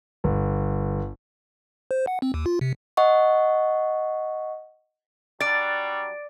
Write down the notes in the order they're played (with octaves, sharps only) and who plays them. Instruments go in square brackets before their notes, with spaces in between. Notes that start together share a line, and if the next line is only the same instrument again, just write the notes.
[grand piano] G1
[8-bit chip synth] C5
F#5
C4
D#2
F4
C3
[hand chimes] D#5 F#5 C#6
[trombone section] F#3 G3 D4 [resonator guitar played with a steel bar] D5 [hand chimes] A6 D7